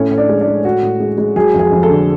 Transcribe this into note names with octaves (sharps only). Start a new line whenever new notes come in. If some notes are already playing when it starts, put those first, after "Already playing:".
Already playing: A2 C#4
A2
D4
G#3
D4
G#3
A2 F#4
A2
G#3
G#3
F#3 G#4
F2
G#4
F2
A4
D3